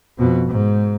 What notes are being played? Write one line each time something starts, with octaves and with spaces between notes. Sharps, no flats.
F2 B2
G#2